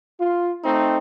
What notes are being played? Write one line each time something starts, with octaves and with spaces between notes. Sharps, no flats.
F4
A3 C4 D#4